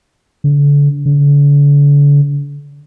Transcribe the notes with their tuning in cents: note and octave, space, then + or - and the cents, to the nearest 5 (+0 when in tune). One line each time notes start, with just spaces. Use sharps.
D3 -35
D3 -40